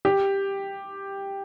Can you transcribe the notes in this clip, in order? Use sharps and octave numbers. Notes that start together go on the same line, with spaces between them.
G4